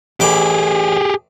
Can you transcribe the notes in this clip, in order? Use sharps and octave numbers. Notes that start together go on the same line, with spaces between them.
A1 G4 G#4 B5 D6